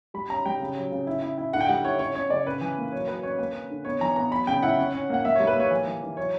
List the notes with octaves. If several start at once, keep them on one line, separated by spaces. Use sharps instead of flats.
G3 B5
C#4 A#5
G3 G5
C#3
F#3
C#3
E4
E4
E4
D3 F#5
G5
G3 F#5
E4 C#5
C#4 C#5
C#4 C#5
C#3 D5
C#4 B4
E3
A#3
F#3 C#5
F#3 B4
C#4 C#5
A#3 B4
C#4
D3
B3 C#5
E3 A#5
B3 A#5
F#3 B5
C#3 G5
E4 F#5
C#4
C#4
A#3 F#5
A#3 E5
G3 C#5
B4
A#3 C#5
E3
E3
E3
F#3 C#5